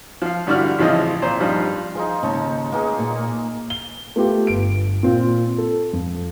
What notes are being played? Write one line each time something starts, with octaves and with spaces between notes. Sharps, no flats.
F3 F5
G2 D3 E4 F#4 D5 F6
A1 C#3 F3 C4 E4 D#5
A#2 C5
G2 F3 D4 D#4
F3 D#4 F4 G#4
D#2 G#2 C#3 D#4 C#5 A5
A#3 B3 D#4 G#4
A#2
G7
A3 B3 F4 G4
G1 D7
A#2 C4 F4
A4
F2